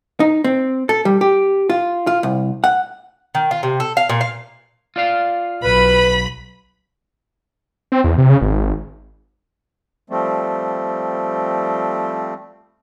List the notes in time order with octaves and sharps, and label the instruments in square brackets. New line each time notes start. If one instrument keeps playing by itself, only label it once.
[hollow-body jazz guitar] D#4
C4
A4
G3
G4
F4
F4
C2
F#5
[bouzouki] D#3
F4
C3
A4
F5
A#2
F5
[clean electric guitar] F4 D5 F5
[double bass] B1 [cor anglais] B4 [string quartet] B5
[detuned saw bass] C4
E2
C3
C#3
G#1
[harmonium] F3 G3 A3 C4